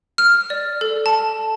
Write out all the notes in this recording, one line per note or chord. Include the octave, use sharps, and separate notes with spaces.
F6
D5
A4
A5